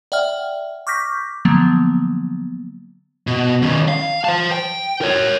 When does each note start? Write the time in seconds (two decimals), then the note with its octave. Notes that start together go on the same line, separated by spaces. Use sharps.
0.12 D5 E5 F#5 G5 F6
0.87 C#6 D6 F6 G6 A#6 B6
1.45 D3 F3 F#3 A#3 B3
3.27 B2
3.62 D#3 C#4
3.88 F5
4.25 C5 A5
4.51 G5
5.01 A#4 C#5